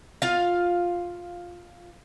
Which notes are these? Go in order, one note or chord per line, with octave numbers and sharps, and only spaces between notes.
F4 F5